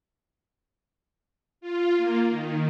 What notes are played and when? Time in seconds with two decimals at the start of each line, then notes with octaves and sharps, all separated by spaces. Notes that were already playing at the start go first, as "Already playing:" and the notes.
1.61 F4
1.97 A#3
2.28 D#3